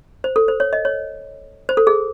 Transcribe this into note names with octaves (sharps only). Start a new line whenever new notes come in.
C5
A4
C5
C#5
D#5
C#5
C5
A4
G#4